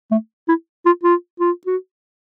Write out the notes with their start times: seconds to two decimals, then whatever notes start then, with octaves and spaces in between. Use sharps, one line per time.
0.11 A3
0.48 E4
0.86 F4
1.04 F4
1.40 F4
1.66 F#4